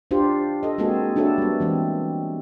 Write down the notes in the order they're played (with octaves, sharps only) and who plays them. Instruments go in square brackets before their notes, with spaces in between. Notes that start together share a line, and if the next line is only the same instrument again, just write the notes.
[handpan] D4 F4 G4 C5
A4 D#5
G#3 A#3 C4 F#4 G#4 A4
D4 E4 F#4 A4 C#5
G3 B3
E3 G#3 C4